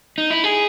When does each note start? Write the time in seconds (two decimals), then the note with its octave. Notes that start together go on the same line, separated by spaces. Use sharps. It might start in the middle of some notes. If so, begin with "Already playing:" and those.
0.18 D#4
0.31 E4
0.44 G#4